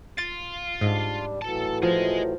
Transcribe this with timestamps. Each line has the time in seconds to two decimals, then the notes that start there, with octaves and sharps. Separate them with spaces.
0.18 F4 A6
0.81 G#2 G3 D4
1.42 A2 E3 F#3 A4 A5
1.83 F3 G#4 D#5